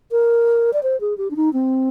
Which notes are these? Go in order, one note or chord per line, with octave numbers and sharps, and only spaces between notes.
A#4
D5
C5
G#4
G4
D4
D#4
C4